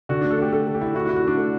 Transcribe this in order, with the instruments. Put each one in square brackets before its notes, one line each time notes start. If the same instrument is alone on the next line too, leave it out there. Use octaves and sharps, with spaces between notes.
[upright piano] D3 [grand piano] F#4
[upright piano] A3 [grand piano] D4
[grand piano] A4
[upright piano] A3 [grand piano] G4
[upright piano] A3 [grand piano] A4
[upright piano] A3
[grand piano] G4
[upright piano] E4
[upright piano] E4 [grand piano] F#4
[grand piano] F#4
[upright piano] E4
[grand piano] F#4
[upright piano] A3 [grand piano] D4
[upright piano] A3